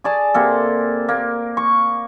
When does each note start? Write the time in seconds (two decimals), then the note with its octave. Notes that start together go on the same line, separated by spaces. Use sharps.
0.04 G#4 D5 A5
0.34 C3 A#3 A4
1.09 A#3
1.57 C#6